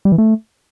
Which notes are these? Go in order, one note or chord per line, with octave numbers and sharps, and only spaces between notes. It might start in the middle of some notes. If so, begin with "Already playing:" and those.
G3
E3
A3